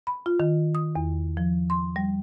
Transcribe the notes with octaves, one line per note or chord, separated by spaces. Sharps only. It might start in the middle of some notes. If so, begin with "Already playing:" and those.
B5
F4
D#3
D#6
E2
F3
C6
G3